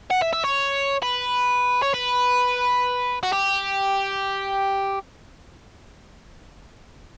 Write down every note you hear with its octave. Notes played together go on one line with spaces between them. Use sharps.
F#5
E5
E5
C#5
B4
C#5
B4
F#4
G4